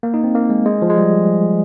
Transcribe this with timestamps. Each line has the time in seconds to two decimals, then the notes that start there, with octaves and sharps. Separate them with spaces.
0.03 A#3
0.14 D#4
0.24 C4
0.35 A#3
0.50 G#3
0.66 G#3
0.82 F3
0.90 G#3
0.98 G3